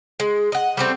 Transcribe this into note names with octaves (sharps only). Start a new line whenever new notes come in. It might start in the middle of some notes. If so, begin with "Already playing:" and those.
G#3
D#5 F#5
G3 A3 C4